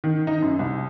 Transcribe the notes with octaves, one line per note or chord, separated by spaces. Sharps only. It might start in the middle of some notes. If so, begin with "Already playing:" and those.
D#3
D#4
F#2
C2